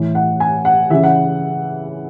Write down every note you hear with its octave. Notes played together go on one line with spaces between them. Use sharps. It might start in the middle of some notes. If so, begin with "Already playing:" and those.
Already playing: A2 E3
F#5
G#5
F#5
C#3 E3 E5
F#5